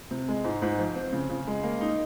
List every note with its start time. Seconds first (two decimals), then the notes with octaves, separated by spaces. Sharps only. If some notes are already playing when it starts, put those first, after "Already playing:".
0.11 C3
0.28 G#3
0.44 G#2
0.62 G#2
0.79 F3
0.95 C4
1.12 C#3
1.29 C#3
1.47 G#3
1.63 A#3
1.81 D#4